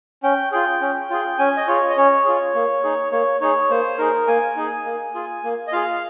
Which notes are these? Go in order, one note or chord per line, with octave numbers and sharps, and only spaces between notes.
C#4 G5
F4 G#4 G5
C#4
F4 G#4
C#4 G#5
D#5
F4 G#4 C#5
D#5
C#4 C#5
F4 G#4
A#3
D#4 G#4
A#3 C#5
D#4 G#4 C#5
A#3 C5
D#4 G#4 A#4
A#3 G#5
D#4 G#4
A#3
F4 G#4
A#3
D#5
F4 G#4 F5